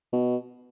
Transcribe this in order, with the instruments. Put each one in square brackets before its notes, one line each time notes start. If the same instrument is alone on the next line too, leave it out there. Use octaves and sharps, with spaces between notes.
[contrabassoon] B2